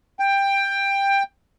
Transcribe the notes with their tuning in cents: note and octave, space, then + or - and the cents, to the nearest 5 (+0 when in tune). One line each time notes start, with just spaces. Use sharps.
G5 +15